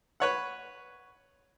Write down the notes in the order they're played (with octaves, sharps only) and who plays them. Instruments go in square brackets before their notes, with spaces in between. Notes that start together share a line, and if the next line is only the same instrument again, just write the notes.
[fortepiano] B4 C#5 F#5